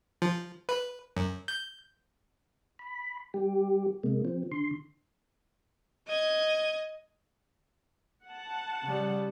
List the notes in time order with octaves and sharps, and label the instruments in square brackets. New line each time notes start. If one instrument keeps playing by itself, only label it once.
[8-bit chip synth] F3
B4
F#2
G6
[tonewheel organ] B5
G3 G4
C3 G#3 A#3
F3 C4
D3 C6
[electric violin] D#5 G#6
[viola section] F#5 A5
[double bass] C#3 G3